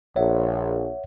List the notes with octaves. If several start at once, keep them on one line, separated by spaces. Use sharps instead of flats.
A#1 C#5 E5 F#5